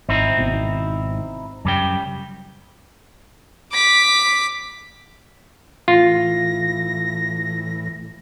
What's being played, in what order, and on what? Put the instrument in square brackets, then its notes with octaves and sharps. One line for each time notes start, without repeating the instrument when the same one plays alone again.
[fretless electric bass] G#1 [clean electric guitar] C4 D#4 E4
[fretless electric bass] G#1 B2
[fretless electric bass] F#2 [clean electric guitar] C#3 G3 G5
[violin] D6 B6
[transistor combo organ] A2 E3 [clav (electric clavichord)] F4 [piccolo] A#6